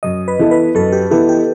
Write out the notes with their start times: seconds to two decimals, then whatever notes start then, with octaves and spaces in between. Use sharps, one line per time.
0.03 F#2 D#5
0.28 B4
0.39 E3 B3 E4 A4
0.51 B4
0.75 F#2 A4
0.92 G4
1.11 E3 B3 E4 G4 A4
1.29 G4